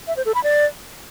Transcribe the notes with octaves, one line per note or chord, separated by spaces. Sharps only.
E5
C5
A4
B5
D5